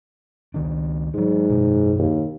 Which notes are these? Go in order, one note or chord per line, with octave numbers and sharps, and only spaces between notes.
C#2 D#3 D4
G#2 F#3 G#3
F#2 B2
D#2